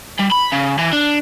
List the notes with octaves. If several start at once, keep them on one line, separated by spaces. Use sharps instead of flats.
G3
B5
C#3
E3
D4